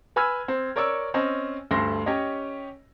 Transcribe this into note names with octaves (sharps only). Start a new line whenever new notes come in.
B4 G#5 B5 E6 F6 G#6
C4
A#4 C#5 D5 C#6 E6
C4 C#4 D#5
D2 G2 A3 C6 A#6
C#4 G4 C#5 D#5